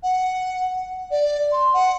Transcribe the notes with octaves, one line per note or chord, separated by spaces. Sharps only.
F#5
D5
C6
F#5